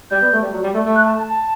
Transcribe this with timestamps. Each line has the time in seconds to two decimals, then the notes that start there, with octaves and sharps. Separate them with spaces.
0.11 G3 G6
0.22 B3
0.33 A3
0.42 G3
0.53 F#3
0.63 G3
0.74 A3
0.85 A3
0.95 F#6
1.06 A5
1.16 A5
1.27 A5